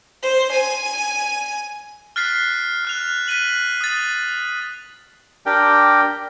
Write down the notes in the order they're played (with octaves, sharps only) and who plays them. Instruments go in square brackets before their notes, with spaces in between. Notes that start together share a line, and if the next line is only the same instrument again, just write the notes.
[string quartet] C5
G#5
[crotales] F6 F#6 A6 B6 C7
F6 F#6 F7
F#6 B6 D#7 F#7
D#6 A6
[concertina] D4 G4 A#4 G5